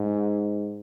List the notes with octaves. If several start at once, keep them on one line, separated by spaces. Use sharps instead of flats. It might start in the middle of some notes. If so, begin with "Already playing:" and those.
Already playing: G#2